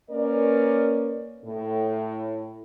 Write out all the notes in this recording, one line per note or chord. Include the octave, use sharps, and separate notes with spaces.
A#3 C#4 A#4 B4 D5
A2